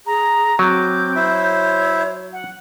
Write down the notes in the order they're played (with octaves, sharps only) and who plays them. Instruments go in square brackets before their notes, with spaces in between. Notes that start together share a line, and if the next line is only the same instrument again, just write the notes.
[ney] G#4 [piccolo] A#5
[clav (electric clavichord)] F#3 [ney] C4 [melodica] D6 [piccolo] G6
[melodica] E4 C5 E5
[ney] C#5
[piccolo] F#5